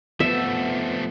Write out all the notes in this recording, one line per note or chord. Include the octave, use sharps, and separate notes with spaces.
F3 A3 B3 E5